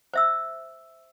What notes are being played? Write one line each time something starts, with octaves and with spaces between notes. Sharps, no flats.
C5 E5 E6